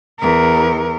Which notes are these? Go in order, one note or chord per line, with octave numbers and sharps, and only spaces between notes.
E2 A#4